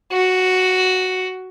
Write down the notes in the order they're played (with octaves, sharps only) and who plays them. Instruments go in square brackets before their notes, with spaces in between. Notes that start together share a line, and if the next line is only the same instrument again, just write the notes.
[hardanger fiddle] F#4